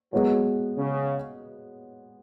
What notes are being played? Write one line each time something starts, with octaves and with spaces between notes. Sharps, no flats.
F#3 G#3 B3 F#4 C#5
C#3